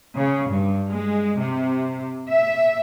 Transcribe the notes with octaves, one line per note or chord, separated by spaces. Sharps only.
C#3
G2
G#3
C3
E5